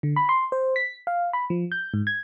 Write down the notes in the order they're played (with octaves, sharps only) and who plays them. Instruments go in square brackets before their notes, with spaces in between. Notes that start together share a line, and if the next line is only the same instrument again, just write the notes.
[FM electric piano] D3
B5
C6
C5
B6
F5
B5
F3
G6
G#2
G#6